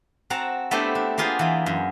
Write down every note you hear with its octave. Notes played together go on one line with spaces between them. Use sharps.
C4 F#4 F#5 A5 A#5
A3 B3 C4 D4 E4 G4
D4
A#3 B3 F4 G#4 C5
E3 F4
F#2